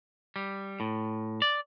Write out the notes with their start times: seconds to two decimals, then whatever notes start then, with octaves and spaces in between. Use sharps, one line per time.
0.36 G3
0.80 A2
1.42 D5